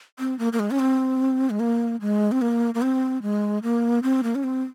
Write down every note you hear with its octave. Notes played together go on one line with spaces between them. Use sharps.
C4
A#3
A#3
G#3
C#4
C4
G#3
A#3
G#3
C4
A#3
A#3
C4
G#3
A#3
C4
A#3
C#4
C4